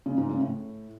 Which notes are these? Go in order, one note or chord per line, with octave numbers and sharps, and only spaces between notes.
C#3
G#2
C#3
A2